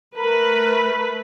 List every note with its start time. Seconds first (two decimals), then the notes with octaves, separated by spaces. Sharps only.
0.17 A3 A#4 B4